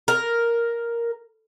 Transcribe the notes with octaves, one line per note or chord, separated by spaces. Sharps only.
A#4